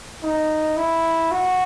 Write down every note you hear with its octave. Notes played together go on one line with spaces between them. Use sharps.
D#4
E4
F#4